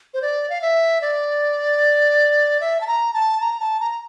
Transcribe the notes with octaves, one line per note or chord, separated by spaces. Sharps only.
C5
D5
F5
E5
D5
E5
A5
A#5
A5
A#5
A5
A#5